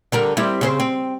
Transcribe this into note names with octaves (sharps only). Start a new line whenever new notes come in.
D3 G3 A#4
G3 C4 E4
C#3 C4 C5
C4